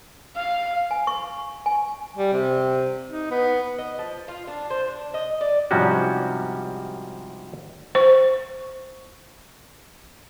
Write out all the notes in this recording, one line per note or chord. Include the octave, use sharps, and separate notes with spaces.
F5
G#5
C#6
G#5
G3
C3
D#4
B3
D#5
F3
F4
D4
C5
D4
D#5
D5
G#2 C3 F3 G3 C#4 F#4
C5 C#6